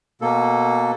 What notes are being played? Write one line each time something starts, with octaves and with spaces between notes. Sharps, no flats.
B2 A#3 A4